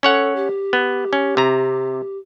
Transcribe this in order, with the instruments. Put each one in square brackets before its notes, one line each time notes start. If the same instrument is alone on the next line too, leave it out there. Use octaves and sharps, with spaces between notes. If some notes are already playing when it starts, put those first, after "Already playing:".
[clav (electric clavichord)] C#4 C#5 F#5 [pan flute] A4
[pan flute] G4
[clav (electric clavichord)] B3
C#4
C3 A#5